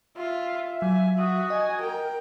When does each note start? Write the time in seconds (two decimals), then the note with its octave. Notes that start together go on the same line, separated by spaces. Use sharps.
0.17 F4 E5
0.82 F#3 G#5
1.18 F#4 D#6
1.50 D#5 G#5
1.80 A#4 G5